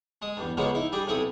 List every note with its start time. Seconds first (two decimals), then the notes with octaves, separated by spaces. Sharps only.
0.22 G#3 D#6
0.37 E2 G2
0.57 C#3 F3 F#3 G#3 A#3 B3
0.75 D#4 E4
0.92 G3 D4 G4 G#4
1.07 B1 C3 E4 G#4 A4 D#6